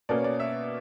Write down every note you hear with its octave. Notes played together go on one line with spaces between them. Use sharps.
B2 A#3 C#4 D5
C#5
D5
E5